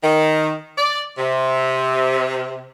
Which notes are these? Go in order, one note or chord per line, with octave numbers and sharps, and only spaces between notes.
D#3
D5
C3